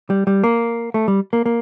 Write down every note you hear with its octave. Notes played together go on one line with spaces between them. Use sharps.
G3
G3
A#3
A3
G3
A#3
A#3